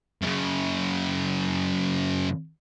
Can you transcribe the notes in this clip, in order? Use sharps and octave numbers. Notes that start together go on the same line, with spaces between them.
F#2 C#3